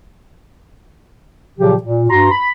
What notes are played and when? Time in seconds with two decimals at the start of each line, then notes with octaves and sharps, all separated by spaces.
1.59 A#2 C#3 F3 F#3 G4
1.83 A#2
2.10 G2 F#4 A#5 C6
2.31 B5